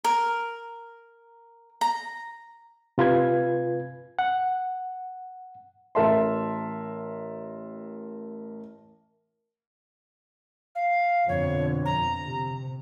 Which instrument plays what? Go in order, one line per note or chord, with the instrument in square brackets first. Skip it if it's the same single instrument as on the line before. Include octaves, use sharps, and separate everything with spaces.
[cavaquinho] A#4
A#5
[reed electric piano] C3 F4 B4 G#6
F#5
[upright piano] A1 A#4 E5 A5 C6
[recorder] F5
[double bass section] F2 B2 D3 [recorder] C#5
[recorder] A#5
[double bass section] C3